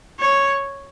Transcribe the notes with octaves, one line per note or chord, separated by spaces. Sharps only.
C#5